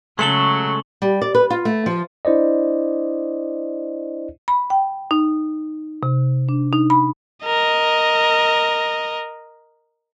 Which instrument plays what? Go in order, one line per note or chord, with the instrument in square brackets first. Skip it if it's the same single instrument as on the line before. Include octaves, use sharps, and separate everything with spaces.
[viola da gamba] C#3 [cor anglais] F#3 [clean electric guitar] G#3 A3 A4 [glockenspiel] C#6 F#7 G7
[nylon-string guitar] G3
D5
B4
F4
A3
F3
[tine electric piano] D4 E4 C5 D5 D#5
[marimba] B5
G5
D#4
C3
D4
D#4
B5
[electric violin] A#4 D#5